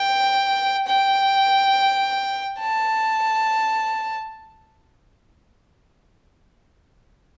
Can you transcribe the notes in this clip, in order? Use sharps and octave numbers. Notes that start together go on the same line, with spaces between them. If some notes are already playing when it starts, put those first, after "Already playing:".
Already playing: G5
G5
A5